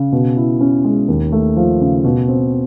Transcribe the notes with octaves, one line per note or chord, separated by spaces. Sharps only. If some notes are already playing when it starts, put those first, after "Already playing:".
Already playing: C#3
B2
E4
C#4
G#3
D#2
A3
F3
C#3
B2
C4